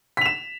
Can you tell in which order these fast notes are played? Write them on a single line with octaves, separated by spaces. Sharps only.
B6 F7 E7